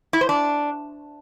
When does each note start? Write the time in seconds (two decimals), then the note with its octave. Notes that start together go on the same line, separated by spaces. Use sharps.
0.13 E4
0.21 C5
0.29 D4